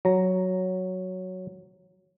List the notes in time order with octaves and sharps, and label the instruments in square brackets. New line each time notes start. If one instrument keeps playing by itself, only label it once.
[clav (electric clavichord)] F#3 A#5